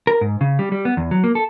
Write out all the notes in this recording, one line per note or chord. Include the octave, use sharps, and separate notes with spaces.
A#4
G#2
C#3
G3
G3
B3
E2
F#3
A#3
A4